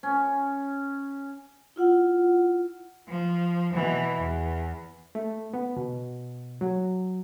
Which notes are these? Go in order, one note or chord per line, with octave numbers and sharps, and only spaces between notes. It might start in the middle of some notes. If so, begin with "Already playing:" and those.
C#4
E4 F4 F#5
F3
B2 E3
E2
A3
B3
B2
F#3